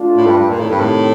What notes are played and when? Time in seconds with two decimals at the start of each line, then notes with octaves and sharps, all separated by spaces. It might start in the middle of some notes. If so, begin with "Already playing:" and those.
Already playing: A3 D4 F4
0.17 A2
0.26 G2
0.38 G2
0.49 A#2
0.60 A2 C3 D#3 G3 C4
0.70 G2
0.80 A2